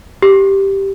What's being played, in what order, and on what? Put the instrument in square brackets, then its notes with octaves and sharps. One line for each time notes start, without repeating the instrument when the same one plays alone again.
[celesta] G4